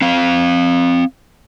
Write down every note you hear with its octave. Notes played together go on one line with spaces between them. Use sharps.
C4 F5